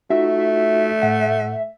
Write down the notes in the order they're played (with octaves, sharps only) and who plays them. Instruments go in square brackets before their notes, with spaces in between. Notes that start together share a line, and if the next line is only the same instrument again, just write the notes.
[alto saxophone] A3 [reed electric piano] D#4 F4 F#4 [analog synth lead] E5
[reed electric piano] A2 F#5